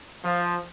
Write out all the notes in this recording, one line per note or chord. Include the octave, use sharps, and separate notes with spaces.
F3